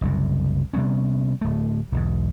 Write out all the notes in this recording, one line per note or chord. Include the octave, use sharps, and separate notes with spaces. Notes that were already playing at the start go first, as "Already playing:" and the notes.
F#1 C2 F#2
C3 G3 B3 C#4
D1 A3
B1 E2 G#2